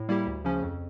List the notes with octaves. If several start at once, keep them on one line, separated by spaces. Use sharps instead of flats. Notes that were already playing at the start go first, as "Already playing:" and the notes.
Already playing: A2
G3 A#3 E4 G4
D2
C#3 F3 C#4
F2